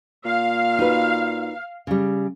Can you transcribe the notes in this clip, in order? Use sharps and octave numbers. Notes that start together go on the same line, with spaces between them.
A#2 F5
D#4 F#4 B4
C#3 G3